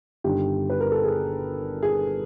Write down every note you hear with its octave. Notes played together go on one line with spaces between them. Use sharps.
G1 G2 D#3 G4
B4
A#4
A4
G#4
G#4